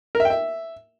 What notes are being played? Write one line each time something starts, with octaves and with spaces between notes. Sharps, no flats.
A#4
E5
G5
E5